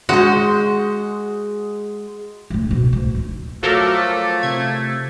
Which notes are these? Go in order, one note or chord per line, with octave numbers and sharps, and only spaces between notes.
G#3 F#4 C5
A2 C#3
B1 B2
D2
D#3
F3 F#3 A3 A4 A#4 D6
C3 G#6